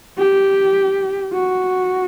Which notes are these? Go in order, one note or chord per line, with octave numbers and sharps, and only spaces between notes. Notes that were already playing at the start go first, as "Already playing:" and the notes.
G4
F#4